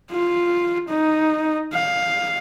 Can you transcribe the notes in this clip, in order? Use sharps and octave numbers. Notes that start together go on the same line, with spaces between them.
F4
D#4
F5